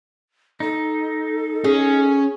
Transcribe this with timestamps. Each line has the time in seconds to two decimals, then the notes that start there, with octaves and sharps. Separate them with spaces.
0.60 D#4 A4
1.64 C#4 G#4